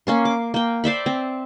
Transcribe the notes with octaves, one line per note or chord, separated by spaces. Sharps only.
A#3 C#4 C6
D6
A#3 G5
C5 D5 E5 B5
C4